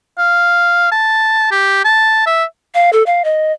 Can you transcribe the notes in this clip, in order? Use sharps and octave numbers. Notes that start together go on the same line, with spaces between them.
F5
A5
G4
A5
E5
F5
A4
F5
D#5